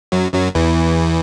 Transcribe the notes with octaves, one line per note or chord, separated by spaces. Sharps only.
F#2 F#3
F#2 F#3
E2 E3